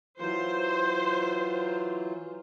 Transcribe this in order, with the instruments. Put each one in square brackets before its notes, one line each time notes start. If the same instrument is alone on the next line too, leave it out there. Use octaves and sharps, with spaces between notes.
[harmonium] E3 F#3 F4 [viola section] C5